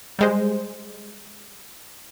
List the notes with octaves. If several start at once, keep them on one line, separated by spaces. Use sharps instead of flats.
G3 G#3 C5